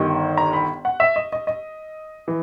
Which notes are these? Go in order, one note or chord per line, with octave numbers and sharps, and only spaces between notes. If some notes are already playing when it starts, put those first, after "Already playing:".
Already playing: G1 G2 D#3 G3
A#5
B5
F#5
E5
D#5
D#5
D#5
E3